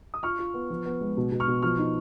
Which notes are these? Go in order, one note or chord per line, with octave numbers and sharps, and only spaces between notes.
D#6
F4 C#6 F6
F4
B3
F3
B3
G#3
B2
B2
C#6 F6
B2
F3 C#6 F6
D#4